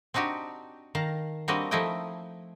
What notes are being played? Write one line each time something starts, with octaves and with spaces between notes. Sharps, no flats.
C4 D4 D#4 F#4 G4
D#3 F5 A5 A#5
G3 A#3 C4 D4 F#4 D#5
F3 A3 D#4 E4 D#5 G5